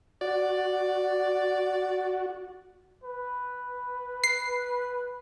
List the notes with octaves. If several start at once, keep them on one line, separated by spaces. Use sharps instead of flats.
F#4 D5
B4
C7